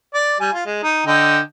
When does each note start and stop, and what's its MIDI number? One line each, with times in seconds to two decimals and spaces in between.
0.14 0.40 74
0.40 0.52 55
0.40 0.52 80
0.53 0.64 65
0.66 0.81 56
0.83 1.03 63
1.07 1.40 50
1.07 1.40 75
1.07 1.40 79